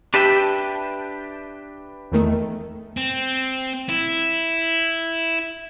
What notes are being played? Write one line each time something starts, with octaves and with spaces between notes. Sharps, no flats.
D4 G4 B4 E5 A5 G6 B6
E2 D#3 A3
C4
E4